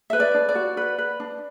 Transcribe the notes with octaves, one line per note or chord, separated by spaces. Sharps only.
B4 E5
D5
D4
D5
F#4
B4
B4
D4